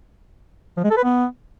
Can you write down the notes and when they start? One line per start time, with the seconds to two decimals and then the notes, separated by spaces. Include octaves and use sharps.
0.77 F3
0.84 G#3
0.90 A4
0.97 B4
1.04 B3